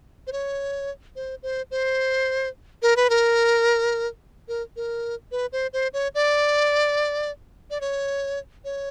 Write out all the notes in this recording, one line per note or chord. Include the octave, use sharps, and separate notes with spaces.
C5
C#5
C5
C5
C5
A#4
B4
A#4
A#4
A#4
B4
C5
C5
C#5
D5
D5
C#5
C#5